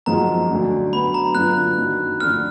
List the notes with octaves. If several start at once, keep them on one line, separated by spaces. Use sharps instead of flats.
F#2 F3 G#3 D#4 F#4 A#5
D2 D3 F#3 D4 F#4
D3 F#3 B3 B5
A#5
F#2 D3 F#3 B3 F4 F#6
F#2 D#3 F#3
D2 D3 F3 F6